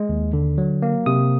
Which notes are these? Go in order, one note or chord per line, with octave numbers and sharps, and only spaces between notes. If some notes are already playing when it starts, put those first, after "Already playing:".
Already playing: G#3
D#2
D3
F#3
A#3
C3 D#6